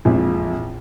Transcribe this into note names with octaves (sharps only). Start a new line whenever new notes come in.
A#1 F2 E3 F3 G#3